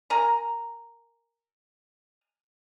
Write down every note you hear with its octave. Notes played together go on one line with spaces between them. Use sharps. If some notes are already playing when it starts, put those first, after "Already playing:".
A#4 G#5 A#5